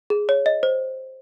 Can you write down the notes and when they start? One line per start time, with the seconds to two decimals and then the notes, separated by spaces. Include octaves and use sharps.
0.10 G#4
0.29 C#5
0.46 D#5
0.63 C5